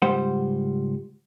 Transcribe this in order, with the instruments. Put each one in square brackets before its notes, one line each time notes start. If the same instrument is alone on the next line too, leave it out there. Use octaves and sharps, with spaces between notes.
[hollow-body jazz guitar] C#2 G#2 G3 C5 F#5